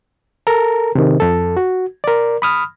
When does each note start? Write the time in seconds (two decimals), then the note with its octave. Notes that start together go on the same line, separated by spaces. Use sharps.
0.47 A4 A#4 A#5
0.95 C3 D#3
1.20 F2 A4
1.57 F#4
2.04 A#4 D5
2.42 B5 D#6 F6